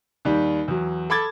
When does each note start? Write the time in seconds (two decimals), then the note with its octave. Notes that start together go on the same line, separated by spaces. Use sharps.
0.25 D#2 G3
0.68 E2 F#3
1.10 A4 B5 D6 G#6 A6